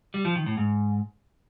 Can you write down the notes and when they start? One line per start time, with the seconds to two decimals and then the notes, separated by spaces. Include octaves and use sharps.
0.14 G3
0.25 F3
0.36 D#3
0.46 A2
0.57 G#2